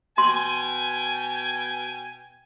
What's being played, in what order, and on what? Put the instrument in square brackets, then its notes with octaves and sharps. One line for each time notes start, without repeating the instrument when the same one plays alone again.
[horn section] B2 G5 G#5 [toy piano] C6